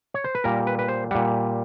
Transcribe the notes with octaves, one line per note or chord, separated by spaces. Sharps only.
C#5
C5
B4
A#2 G3 A#4
B4
B4
C5
A#2 G3 F#5